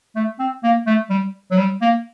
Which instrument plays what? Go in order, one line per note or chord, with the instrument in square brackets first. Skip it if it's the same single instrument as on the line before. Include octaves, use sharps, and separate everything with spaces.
[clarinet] A3
C4
A#3
A3
G3
F#3
G3
A#3